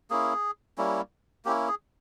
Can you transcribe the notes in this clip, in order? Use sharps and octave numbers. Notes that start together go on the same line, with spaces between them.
A#3 C#4 E4 G#4
G3 A#3 C#4 E4
A#3 C#4 E4 G4
G#4